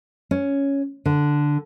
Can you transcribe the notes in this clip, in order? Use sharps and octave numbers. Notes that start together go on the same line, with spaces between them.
C#4
D3